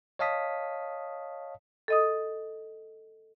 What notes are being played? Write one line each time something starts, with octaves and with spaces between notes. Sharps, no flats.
C#5 D#5 F5 A5 D#6 B6
A4 D#5 D#6